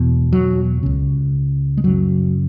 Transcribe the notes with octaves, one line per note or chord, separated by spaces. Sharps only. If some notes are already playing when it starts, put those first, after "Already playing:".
Already playing: E2 B2 E3
F#3
C#2 C#3
G#3
F#2 C#3 F#3